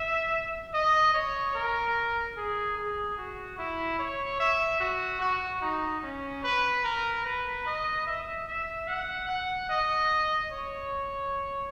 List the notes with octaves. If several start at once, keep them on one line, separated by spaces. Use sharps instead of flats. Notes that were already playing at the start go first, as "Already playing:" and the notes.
Already playing: E5
D#5
C#5
A#4
G#4
G#4
F#4
E4
C#5
E5
F#4
F#4
D#4
C#4
B4
A#4
B4
D#5
E5
E5
F#5
F#5
D#5
C#5